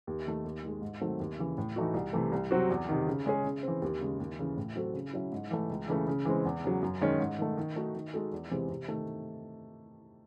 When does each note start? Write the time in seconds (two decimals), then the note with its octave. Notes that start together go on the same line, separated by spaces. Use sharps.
0.07 D#2
0.26 D#3 A3
0.45 D#2
0.63 D#3 G#3
0.82 G#2
1.01 D#3 F#3 A3 C4
1.20 D#2
1.38 C#3 E3
1.58 A2
1.76 E3 A3 D#4 F#4
1.94 C2
2.13 C3 E3 A3
2.32 C2
2.51 C3 F#3 C4 F#4
2.70 E2
2.89 C3 D#3
3.07 C#3
3.26 G#3 C#4 G#4
3.44 C#3
3.63 E3 C4
3.82 D#2
4.01 C#3 G#3
4.20 D#2
4.39 C#3 E3
4.57 A2
4.76 F#3 C4 F#4 A4
4.94 C#3
5.13 F#3 C#4 E4
5.32 G#2
5.51 E3 A3
5.70 C#2
5.88 C#3 E3 A3
6.08 C#3
6.25 E3 G#3 C4
6.45 E2
6.64 C#3 F#3
6.83 F#2
7.01 D#3 G#3 C#4
7.20 G#2
7.39 D#3 A3
7.57 D#3
7.76 A3 D#4 F#4
7.95 D#3
8.14 G#3 D#4 F#4 A4
8.32 E2
8.51 C3 E3 G#3 C4
8.69 C3
8.88 D#3 A3